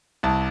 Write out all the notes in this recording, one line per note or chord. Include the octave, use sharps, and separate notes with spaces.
C2 A5